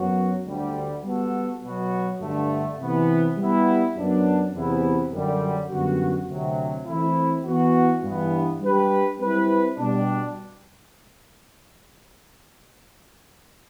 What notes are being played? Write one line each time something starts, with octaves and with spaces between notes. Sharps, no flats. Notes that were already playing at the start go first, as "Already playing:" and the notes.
Already playing: F#2 F#3 B3 F#4
D2 D3 G3
G3 B3 F#4 A4
B2 F#3 B3 F#4
G2 D3 A3
C3 E3 B3
G3 B3 E4
F#2 F#3 B3 D4
E2 C3 E3 B3 E4
F#2 D3 G3
F#2 D3 G3 B3 F#4
D2 C3 F#3
E3 A3 C4 E4
E3 B3 F#4
G2 E3 B3
G3 D4 G4 B4
G3 C4 E4 B4
B2 G3 D4